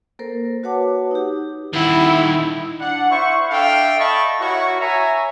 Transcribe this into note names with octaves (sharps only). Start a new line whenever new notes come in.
A#3 A4 A#4 C5
F#4 B4 C#5 F#5 A5 D6
D#4 G4
D#3 E4 F#5
D4 F#5
E4 C5 C#6
D4 A4 E5 F5 G5
D#5 E5 A5 B5 C#6
E4 F#4 A#4 C#5 C#6
C#5 E5 G#5 A#5